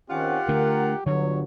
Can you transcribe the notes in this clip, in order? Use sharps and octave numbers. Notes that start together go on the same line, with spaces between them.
D#3 C4 C#4 F4 G4 F#5
D3 A3 D4 A#4
G1 D3 F#3 C#5